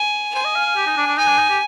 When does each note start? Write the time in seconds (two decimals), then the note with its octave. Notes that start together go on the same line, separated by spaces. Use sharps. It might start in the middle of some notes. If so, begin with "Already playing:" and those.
Already playing: G#5
0.34 C5 G#5
0.45 D#5
0.55 F5
0.66 F5
0.76 G4
0.87 D#4
0.97 D4
1.07 D4
1.18 D#4 G#5
1.28 D4
1.39 D#4
1.49 G4